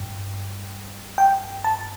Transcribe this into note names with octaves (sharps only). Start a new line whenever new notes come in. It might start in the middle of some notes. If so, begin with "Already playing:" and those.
Already playing: G2
G5
A5